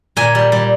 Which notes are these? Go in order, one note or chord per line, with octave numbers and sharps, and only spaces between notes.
A#2 G#5
G3
G3